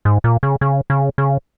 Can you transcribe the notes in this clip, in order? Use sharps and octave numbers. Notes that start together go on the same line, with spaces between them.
G#2
A#2
C#3
C#3
C#3
C#3